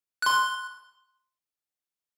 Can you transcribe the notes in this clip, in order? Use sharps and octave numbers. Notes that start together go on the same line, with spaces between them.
C6 F#6